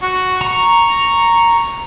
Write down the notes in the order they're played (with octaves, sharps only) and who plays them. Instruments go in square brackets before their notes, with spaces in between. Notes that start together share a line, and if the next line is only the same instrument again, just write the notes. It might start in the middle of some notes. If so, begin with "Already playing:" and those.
[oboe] F#4
[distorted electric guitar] A#5 [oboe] C#6